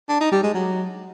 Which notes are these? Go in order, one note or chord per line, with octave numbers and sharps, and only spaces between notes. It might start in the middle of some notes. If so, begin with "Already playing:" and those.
D4
D#4
G3
G#3
F#3